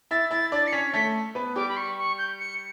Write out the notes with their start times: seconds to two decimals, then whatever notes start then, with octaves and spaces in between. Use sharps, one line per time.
0.11 E4 E5 A6
0.31 E4 E5 A6
0.52 D4 D5 A6
0.67 C#7
0.72 C#4 C#5 B6
0.93 A3 A4 B6
1.35 B3 B4
1.56 G3 G4 D6
1.69 B5
1.77 C#6
1.98 C#6
2.18 G6
2.39 C#7